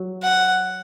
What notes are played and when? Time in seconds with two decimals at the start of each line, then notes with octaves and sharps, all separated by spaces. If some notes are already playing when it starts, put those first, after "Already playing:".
Already playing: F#3
0.23 F#5